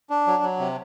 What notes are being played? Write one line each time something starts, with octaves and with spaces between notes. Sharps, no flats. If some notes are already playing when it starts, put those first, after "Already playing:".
D4
F#3
F#3
C3